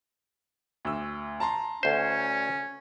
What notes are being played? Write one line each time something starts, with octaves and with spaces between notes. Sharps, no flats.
D2 E6
A5 A#5 C6
D2 C#4 C5